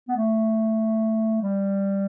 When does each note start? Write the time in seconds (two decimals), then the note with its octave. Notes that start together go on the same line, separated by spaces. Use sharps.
0.08 B3
0.16 A3
1.42 G3